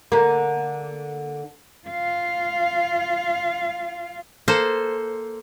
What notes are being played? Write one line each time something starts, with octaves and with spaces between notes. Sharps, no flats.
D3 A#3
F4 F5
A#3 A4 C5